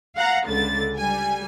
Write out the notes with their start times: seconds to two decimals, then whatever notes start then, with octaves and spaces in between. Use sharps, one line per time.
0.16 F5 F#5 A#5
0.47 C#2 D3 A6
0.97 G3 G#5